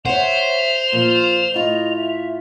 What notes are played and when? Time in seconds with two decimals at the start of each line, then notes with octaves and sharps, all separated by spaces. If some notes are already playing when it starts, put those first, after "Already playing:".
0.05 C5 C#5 E5 F#5 F7
0.92 A#2 F3 F4
1.54 A2 F4 D#5
1.96 E5